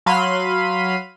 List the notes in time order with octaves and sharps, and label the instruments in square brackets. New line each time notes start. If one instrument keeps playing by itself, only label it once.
[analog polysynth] F#3 F5 B5 C6 B6 D#7